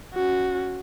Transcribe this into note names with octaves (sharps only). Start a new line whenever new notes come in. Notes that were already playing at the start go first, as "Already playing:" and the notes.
C#4 F#4